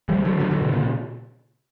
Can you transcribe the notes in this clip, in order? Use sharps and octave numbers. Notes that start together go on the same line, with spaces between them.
E3 G3
D3 F#3
D3 F#3
D3 F#3
B2 D3
A#2 C#3